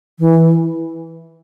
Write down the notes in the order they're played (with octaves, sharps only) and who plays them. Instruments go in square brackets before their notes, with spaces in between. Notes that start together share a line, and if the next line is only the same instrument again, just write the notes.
[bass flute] E3